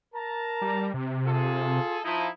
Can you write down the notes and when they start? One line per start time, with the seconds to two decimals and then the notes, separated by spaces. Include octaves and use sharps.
0.14 A#4 A5 A#5
0.62 G3
0.94 C3
1.26 F4 G#4 A4
2.03 F3 D#4 E4